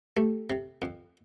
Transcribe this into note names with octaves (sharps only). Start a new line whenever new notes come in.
A3 G4 A4
C3
F2